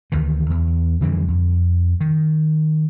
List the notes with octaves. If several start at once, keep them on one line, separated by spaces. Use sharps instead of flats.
D2 D#3 E3
E2
F2 D3 E3 G3
F2
D#3